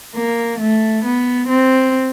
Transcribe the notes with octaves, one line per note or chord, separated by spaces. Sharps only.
A#3
A3
B3
C4